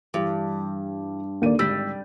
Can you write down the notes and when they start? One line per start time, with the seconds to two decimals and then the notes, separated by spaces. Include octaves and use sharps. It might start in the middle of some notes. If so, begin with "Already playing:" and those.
0.14 G2 E3 G3
1.42 D#2 D3 A#3 D5 D#7
1.59 G#1 G3 E6 B6